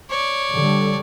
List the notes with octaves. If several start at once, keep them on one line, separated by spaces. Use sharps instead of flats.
C#5 D5
D3 G3